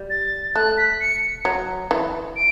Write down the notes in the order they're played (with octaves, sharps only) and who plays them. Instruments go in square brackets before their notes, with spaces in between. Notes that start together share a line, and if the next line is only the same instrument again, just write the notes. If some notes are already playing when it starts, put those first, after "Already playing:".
Already playing: [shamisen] G3
[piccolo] A6
[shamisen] A3 [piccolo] F#6
[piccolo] B6
C#7
[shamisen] F#3
E3
[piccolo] D7